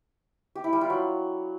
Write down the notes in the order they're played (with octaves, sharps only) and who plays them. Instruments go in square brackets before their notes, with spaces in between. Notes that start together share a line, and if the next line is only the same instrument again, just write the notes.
[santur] G4
E4
G3
F4
F#3